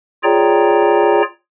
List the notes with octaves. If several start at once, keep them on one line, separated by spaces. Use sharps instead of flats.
F4 G#4 C#5 D5 G5 A#5